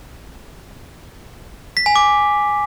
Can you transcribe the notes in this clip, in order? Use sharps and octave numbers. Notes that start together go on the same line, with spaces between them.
B6
G#5
D6